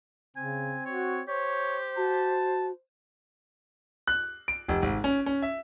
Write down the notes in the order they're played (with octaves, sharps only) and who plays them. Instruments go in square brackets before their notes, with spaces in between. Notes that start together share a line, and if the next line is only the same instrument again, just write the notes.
[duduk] C#3 [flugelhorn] C4 [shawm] G#5
[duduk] F#4 [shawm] C#5
[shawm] G4 [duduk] C5 [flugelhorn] C#5
[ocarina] F#4 [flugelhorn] A5
[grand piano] F#6
D7
F1
G#1
C#4
C#4
E5